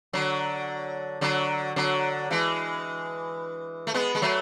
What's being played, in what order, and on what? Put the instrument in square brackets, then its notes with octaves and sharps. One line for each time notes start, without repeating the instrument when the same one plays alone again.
[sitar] D3 F#3
D3 F#3
D3 F#3
E3 G#3
A3
G#3 B3
G#3
F#3 A3